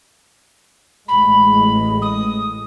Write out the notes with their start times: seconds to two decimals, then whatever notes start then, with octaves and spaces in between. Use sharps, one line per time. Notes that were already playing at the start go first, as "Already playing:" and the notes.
1.08 A1 A2 G#3 B5
2.01 D#6